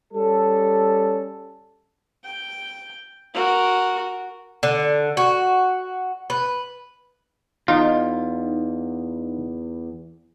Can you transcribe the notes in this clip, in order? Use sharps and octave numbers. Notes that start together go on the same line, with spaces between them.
G3 C#4 A4
G5
F#4 A#4
D3
F#4
B4
E2 D#4 F4